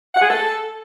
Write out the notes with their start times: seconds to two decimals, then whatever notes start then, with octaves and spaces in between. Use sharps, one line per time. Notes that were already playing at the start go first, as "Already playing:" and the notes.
0.14 F#5
0.22 G#4
0.29 A4